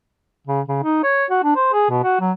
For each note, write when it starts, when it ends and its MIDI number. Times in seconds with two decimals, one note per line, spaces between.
0.47 0.61 49
0.68 0.79 49
0.83 1.03 63
1.04 1.25 73
1.30 1.40 66
1.44 1.56 62
1.56 1.71 72
1.73 1.89 68
1.90 2.02 47
2.03 2.16 66
2.20 2.32 54